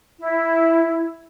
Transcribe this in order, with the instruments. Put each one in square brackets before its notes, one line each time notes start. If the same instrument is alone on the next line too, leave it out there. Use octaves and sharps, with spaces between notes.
[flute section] E4